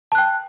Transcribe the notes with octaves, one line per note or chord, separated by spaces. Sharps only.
G5 A5 F#6